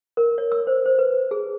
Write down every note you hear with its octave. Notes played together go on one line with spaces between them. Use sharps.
A#4
C#5
E6
C5
C5
B4
G#4